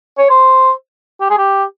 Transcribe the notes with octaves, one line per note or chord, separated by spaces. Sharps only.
C#5
C5
G4
G#4
G4